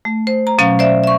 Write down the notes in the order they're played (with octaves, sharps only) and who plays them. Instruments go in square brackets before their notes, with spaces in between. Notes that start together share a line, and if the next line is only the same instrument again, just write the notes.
[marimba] A3
C5
A#5
B2 F#3 C#4 F5
C5 D5 E5
E5 C#6